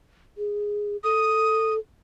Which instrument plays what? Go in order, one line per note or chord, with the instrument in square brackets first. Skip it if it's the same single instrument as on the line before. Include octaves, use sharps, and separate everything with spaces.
[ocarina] G#4
[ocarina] A4 [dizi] D#6